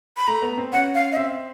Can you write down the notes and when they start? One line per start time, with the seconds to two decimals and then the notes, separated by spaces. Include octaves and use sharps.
0.17 B5
0.27 A3 A#5
0.42 B3
0.57 C4
0.72 C#4 F#5
0.95 F5
1.12 D#5
1.17 C4 E5